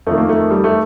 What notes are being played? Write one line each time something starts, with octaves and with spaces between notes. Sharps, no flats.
F2 D#3 A3
A#3
A3
G3
A3